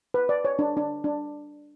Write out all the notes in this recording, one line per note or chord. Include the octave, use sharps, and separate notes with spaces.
B4
D5
C#5
D4
D4
D4